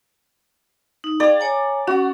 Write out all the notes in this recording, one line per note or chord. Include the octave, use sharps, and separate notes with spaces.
D#4
G#4 D5 F5 G5
C#5 G#5 A#5
C#4 F#4 F#5